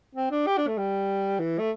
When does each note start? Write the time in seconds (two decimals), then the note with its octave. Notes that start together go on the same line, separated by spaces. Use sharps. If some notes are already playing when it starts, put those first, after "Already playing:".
0.15 C4
0.31 D4
0.46 G4
0.57 D4
0.67 A3
0.78 G3
1.39 E3
1.59 A3